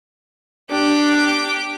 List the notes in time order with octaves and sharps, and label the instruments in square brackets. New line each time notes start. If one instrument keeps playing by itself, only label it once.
[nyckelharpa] D4 [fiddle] G4 D6